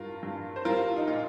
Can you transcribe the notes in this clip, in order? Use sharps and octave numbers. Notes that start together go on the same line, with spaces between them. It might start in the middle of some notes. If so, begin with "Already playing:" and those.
Already playing: G2 F4 A#4
G2
C5
G3 F4 A#4
D#4
A#2 F4